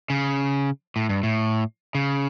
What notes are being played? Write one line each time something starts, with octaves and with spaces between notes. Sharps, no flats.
C#3
A2
G2
A2
C#3